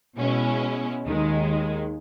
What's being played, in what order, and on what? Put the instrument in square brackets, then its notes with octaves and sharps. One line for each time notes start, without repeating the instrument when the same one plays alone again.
[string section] B2 G#3 C#4 E4
D#2 D#3 G#3